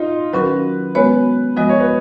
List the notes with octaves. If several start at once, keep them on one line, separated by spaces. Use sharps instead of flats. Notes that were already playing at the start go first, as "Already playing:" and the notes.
Already playing: D#4 F4
D#3 F#3 C#4 F#4 A#4 B4
G#3 B3 F#4 B4 C#5
F3 G#3 B3 F#4 D#5
C#5
B4